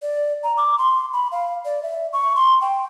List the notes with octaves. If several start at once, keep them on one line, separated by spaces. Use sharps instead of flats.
D5
A#5
D6
C6
B5
F5
D5
E5
C#6
C6
G5